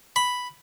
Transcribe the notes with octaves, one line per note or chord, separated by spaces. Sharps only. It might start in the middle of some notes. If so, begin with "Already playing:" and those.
B5